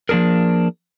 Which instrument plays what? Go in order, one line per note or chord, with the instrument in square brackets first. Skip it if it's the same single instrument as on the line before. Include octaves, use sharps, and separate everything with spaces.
[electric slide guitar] F3 A#3 D4 G#4 A#4